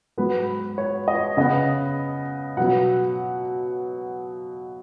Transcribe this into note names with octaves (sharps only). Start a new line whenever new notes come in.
G#2 F#3 B3 B4
C#5
D#5
C#3 B3 D#5
B2 F#3 B3 F#5